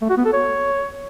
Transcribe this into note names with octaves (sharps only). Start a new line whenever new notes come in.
A3
F#4
B3
A4
C#5